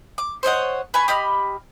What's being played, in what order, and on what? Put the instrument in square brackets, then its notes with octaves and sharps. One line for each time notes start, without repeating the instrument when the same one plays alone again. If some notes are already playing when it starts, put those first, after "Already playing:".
[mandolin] D6
C5 C#5 D#5 F#5
B4 G#5 C#6
G4 D#5 B5 F6